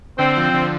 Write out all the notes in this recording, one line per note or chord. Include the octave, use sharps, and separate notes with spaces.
D3 C4
F3
D3